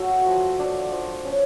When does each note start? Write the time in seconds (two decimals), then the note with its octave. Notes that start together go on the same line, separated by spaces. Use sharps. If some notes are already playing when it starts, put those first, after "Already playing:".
Already playing: F#3 A3 F#4
0.26 F3
0.59 D4
0.92 F3
1.25 C#4